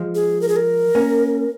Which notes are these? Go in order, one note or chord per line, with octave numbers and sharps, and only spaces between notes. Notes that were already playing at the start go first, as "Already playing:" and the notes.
Already playing: F3 G#3
G#4
A#4
G#4
A#4
A#3 C#4